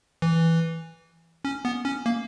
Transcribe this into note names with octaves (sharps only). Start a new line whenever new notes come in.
E3
C#4
B3
C#4
A#3